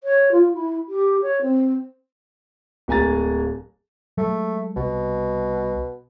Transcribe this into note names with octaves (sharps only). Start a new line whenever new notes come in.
C#5
F4
E4
G4
C#5
C4
D1 A#3 G#5 A#5 A6
F#3 G#3 A3
C2 B2